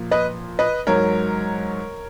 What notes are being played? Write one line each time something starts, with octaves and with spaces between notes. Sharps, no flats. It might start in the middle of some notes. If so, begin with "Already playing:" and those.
Already playing: A#2 F3
B4 D#5
B4 D#5
G#2 F#3 A#4 C#5